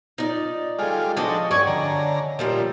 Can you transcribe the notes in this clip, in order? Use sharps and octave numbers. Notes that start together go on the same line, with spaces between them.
D#4 F4 D5 D#6
G3 G#3 F4 G#4 A4 F5
F3 D4 F#4 A4 D#5 F#5 C6 D#6
G2 C#4 D5 G5 G#5 C#6
D3 C#5 D#5 F#5 A#5
A#2 F3 G3 A3